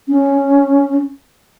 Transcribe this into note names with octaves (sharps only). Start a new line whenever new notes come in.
C#4